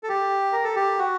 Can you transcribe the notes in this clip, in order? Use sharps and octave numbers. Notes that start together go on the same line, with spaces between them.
A4
G4
A#4
A4
G4
F#4